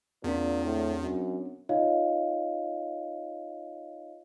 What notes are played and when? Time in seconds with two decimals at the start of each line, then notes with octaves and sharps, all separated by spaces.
0.24 E2 A#2 B3 C4 D4
0.64 A2
1.02 F#2
1.69 D#4 F4 C#5 D#5 F5